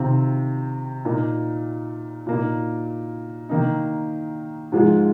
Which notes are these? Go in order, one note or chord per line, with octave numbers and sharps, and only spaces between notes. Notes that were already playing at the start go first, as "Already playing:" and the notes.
Already playing: C3 D#3 C4 F4
A#2 A#3 D#4
A#2 A#3 D#4
D#3 A#3 D#4
G#2 F3 G#3 F4